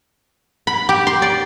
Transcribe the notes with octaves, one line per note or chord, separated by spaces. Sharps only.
B5
G4
C6
D5